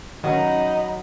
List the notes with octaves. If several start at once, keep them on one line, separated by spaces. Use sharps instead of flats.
D#3 F#3 C#4 D#4 D#5 A#5 B5